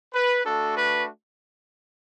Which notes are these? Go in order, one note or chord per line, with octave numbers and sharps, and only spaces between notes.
B4
A3 D4 F#4 A4
B4